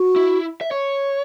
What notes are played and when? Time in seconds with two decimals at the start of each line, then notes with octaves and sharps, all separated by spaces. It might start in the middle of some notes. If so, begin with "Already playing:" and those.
Already playing: F#4
0.16 E4
0.61 E5
0.71 C#5